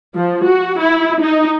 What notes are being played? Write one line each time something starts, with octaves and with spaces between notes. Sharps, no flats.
F3
F#4
E4
D#4